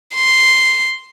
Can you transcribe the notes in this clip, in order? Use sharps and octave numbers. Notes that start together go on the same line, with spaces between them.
C6